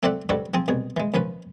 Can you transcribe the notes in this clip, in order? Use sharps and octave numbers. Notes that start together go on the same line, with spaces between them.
A3 C4 A4 D5 E5 F#5
C#2 G#2 G3 F#4 A4 C#6
F3 C4 G#4 G#5 A5
C2 B2 G#4
E3 G#3
D#2 F3 C#4 B4